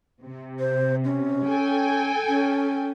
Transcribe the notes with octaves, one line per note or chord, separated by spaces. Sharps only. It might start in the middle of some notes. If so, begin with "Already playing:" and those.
C3
C5
C#4
A4 G5 G#5
C#4